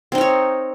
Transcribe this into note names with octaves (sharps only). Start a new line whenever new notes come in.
C4 D#4 A#4 C#5